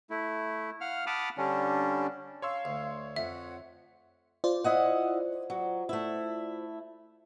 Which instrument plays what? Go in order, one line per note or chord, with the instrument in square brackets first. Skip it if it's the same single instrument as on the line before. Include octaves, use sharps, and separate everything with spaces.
[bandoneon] A3 E4
F5 F#5 F6
F#5 A5 B5 D6 D#6 F6
D3 G3 C#4 D4
[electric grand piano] C#5 C6 E6 [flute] F5
[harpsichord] D2
[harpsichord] F2 [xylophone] E5 [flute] F#5
[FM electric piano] F4 C5 D5
[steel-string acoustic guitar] E4 D#5 F#5
F#3
A3 E4